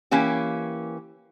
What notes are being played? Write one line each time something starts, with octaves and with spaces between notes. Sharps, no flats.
E3 A#3 C#4 G4